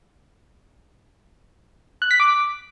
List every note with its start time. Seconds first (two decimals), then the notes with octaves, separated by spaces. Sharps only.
2.02 F#6
2.11 B6
2.20 D6